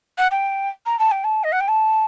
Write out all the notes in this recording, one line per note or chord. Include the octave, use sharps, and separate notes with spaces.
F#5
G5
A#5
A5
G5
A5
D#5
F#5
G5
A5